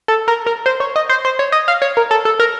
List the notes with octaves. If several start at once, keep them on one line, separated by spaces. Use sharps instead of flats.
A4
A#4
A#4
C5
C#5
D#5
C5
C5
C#5
D#5
F5
C#5
A#4
A4
A4
A#4